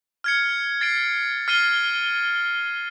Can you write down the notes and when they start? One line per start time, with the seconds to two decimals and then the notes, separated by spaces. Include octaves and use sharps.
0.24 F6 G#6 C#7
0.81 A6 C7 D7
1.48 F6 A6 C7 D#7 G7